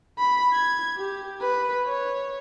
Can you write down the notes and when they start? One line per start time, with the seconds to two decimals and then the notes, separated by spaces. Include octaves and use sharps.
0.18 B5
0.53 G#6
0.97 G4
1.41 B4
1.86 C#5